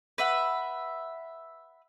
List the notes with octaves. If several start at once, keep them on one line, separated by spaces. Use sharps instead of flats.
B4 E5 F#5